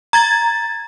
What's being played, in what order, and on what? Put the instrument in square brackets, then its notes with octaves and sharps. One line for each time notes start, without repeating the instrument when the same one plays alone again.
[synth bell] A#5 G#6 A6